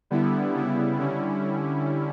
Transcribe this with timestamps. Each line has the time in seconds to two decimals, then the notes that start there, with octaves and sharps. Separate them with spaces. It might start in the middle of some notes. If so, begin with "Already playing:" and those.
0.10 D3 G3 B3 E4
0.55 C#3 G3 B3 E4
0.98 D3 G3 C#4 E4